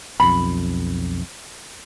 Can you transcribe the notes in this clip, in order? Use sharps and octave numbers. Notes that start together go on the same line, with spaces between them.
B1 F2 B5